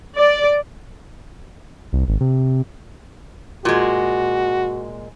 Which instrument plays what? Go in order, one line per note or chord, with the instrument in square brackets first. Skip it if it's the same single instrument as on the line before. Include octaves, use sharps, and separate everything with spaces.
[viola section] D5
[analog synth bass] C2
G#1
C3
[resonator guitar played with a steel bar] A#2 G#3 [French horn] F#4